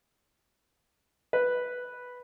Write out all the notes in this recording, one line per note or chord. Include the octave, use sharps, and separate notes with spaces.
B4